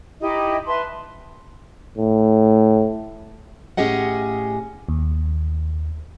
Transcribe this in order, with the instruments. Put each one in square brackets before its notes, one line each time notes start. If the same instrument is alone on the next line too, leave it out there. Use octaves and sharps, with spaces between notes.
[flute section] D#4 E4 G4 D#5
B4 E5 A5 C6
[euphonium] A2
[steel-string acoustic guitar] A2 C#4 G4 G#4 D#5 F#5
[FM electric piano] D#2